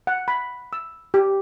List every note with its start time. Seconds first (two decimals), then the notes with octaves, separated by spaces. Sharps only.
0.07 F#5
0.28 B5
0.73 E6
1.14 G4